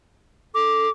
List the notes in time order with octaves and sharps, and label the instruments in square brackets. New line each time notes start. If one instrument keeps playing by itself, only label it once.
[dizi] A4 [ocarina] D6